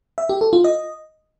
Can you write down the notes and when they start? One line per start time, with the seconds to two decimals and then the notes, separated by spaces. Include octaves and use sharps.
0.18 E5
0.29 G4
0.41 A4
0.53 F4
0.64 D#5